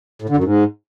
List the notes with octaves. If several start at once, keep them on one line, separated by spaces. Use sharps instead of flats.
A2
D3
F#2
G#2